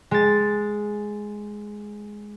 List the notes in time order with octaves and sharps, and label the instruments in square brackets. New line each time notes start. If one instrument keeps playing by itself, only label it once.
[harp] G#3 A6